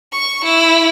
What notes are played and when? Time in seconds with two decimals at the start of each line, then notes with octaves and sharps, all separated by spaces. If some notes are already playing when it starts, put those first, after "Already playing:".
0.12 C#6
0.44 E4